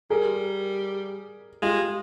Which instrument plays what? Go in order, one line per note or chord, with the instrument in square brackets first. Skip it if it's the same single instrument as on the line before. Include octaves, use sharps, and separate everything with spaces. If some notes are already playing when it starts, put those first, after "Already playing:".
[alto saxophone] G3 [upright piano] G#4 A#4
[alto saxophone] G#3 [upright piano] F4 G4